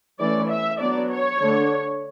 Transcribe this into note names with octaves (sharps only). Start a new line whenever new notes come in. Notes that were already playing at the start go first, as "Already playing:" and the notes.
E3 A3 C#4 D5
E5
F#3 B3 D4 D5
C#5
D3 A3 D4